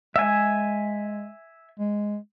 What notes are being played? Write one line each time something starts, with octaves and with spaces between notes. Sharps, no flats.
G#3 E5 G#5
G#3